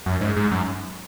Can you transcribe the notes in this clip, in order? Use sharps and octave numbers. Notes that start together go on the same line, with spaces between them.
F#2
G#2
G#2
F#2